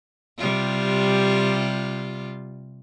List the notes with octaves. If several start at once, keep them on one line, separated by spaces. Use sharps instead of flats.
C3 G3 F4